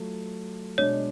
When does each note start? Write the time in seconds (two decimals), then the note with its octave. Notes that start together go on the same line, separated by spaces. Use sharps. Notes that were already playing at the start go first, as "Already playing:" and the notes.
Already playing: F#3 A3 F4
0.78 B2 G#3 D4 C#5